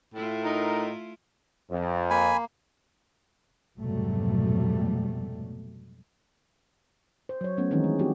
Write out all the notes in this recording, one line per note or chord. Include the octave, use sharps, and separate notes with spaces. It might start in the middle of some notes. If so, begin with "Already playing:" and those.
A2 A3 E4 F4
D#4 A#4
F2
A#3 G#5 B5
F1 G#2 B2 F#3 G3 A3
C5
F#3 C#5
F#3 A3 B3 C#4
D#3 E3 G#3 C4 C#4 D#4
G#3
G3 C4 F#4 G4